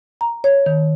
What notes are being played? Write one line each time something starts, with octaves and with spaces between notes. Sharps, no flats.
A#5
C#5
D#3